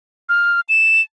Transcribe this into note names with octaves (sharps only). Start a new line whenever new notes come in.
F6
E7